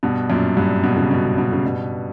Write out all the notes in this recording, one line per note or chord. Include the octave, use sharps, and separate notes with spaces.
G2 B2
F#2 A#2
G2
B2
C#3
B2
C#3
B2
C#3
G2 B2